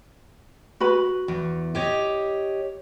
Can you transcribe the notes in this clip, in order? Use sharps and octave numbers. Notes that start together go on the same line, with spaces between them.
F#4 B4 B5
E2
G4 C#5 D#5